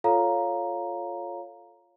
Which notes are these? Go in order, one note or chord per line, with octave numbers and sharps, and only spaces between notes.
F4 A4 C#5 F5 A#5